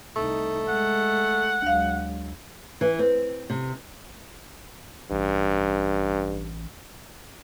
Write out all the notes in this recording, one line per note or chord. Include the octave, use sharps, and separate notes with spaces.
C2 A3 D#4
G#3 F#5
D2 F#3 G#3 F5
E3
C4
C3
A1 G2